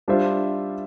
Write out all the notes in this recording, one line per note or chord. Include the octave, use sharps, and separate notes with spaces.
G3 D4 F4 C5 E5